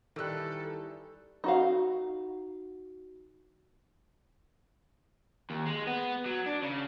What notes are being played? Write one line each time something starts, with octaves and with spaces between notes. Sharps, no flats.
D#3 E3 G3 A4 E6 F#6
D#4 F#4 F5
D#2
G#3
B3
F#3
D4
C#3